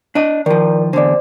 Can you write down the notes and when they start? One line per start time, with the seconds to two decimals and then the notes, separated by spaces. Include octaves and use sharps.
0.15 D4 D#5
0.46 D#3 F3 A#4 D5
0.93 E2 D3 C5 D5